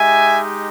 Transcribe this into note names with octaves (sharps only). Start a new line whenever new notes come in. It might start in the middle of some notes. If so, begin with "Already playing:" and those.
Already playing: G#3 D#4 G4 E5 G#5